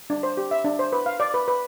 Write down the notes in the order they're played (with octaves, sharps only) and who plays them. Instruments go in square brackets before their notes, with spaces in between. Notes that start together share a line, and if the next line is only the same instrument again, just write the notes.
[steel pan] D4
C5
G4
E5
D4
C5
B4
F5
D5
B4
B4